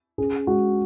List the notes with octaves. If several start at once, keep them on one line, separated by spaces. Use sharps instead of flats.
C#4 G#4
G#3 F#4